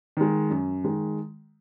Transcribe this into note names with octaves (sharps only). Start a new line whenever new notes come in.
D#3 G#3
F#2
D#3 G#3